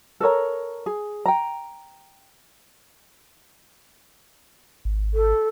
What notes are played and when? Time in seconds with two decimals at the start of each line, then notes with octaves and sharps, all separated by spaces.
0.20 A4 A#4 C#5 A#5
0.86 G#4
1.26 G5 A#5
4.85 G#1
5.14 A4